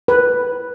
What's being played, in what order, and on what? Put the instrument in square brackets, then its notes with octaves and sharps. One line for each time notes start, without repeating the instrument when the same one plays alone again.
[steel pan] B4